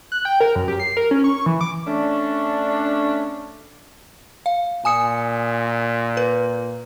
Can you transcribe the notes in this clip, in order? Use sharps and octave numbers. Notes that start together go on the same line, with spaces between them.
F#6
G5
A#4
F#2
G4
C7
A#4
C#4
C#6
E3
D6
A3 C#4 D4
F5
A#2 G#5 D#6 C#7
B4